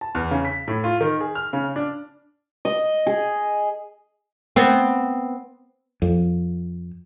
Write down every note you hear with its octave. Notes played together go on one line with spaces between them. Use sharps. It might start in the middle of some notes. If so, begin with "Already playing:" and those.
A5
E2
C#3
B6
A2
F4
D#3
G#4
F6
C#3
D4
D#5
G#4
B3 C4
F2